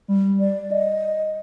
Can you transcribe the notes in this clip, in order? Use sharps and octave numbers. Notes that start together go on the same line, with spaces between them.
G3
D5
D#5